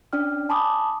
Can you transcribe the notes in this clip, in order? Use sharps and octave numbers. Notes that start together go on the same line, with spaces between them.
C#4 D4 D5 G5 F6
G#5 A5 B5 D6 D#6